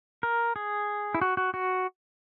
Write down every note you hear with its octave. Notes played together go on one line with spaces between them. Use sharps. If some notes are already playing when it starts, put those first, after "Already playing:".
A#4
G#4
E4
F#4
F#4
F#4